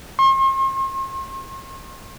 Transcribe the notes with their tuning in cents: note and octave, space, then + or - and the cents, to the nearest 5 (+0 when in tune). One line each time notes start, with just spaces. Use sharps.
C6 +45